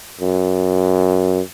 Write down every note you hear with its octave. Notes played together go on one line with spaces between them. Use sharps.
F#2